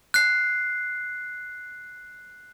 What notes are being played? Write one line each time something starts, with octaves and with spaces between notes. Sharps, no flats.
F#6 C7